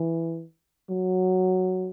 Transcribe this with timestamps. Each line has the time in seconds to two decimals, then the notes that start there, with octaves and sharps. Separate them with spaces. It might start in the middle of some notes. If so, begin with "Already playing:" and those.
Already playing: E3
0.90 F#3